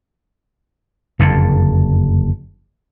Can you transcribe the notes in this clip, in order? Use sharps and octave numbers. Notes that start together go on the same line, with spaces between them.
F#1 F2 D3